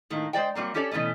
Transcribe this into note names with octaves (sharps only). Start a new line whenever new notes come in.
A2 D#3 A#3
G#3 C5 D5 G5
F#3 G3 A#3 C4
C#4 G4 A4 C#5 D5
B2 E3 A3 B3 C#4